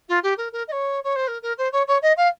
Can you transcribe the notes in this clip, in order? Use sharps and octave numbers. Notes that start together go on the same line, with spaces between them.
F4
G4
A#4
A#4
D#5
C#5
C#5
C5
A#4
A#4
C5
C#5
C#5
D#5
F5